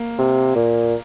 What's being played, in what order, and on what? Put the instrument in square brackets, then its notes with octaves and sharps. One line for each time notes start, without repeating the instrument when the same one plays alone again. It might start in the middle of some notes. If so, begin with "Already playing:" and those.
Already playing: [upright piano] A#3
[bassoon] C3
A#2